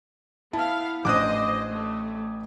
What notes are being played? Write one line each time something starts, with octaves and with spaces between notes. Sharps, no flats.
B3 E4 F5 A5
A1 D4 C5 D#5 D6 D#6 F#6
A3